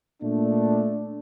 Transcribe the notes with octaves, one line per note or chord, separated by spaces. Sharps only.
A#2 A3 D4